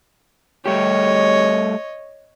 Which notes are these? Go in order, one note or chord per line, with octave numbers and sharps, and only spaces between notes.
G3 A3 G4 C#5 D#5